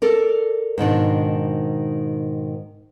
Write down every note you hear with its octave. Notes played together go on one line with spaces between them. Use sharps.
A4 A#4 D5
G#2 B2 D#3 D4